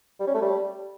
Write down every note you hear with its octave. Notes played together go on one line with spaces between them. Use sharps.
G3
C#4
A3
G3